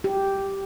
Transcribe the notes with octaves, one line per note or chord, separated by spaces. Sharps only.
G4